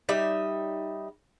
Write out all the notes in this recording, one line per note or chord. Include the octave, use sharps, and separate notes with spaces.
G3 D#4 E5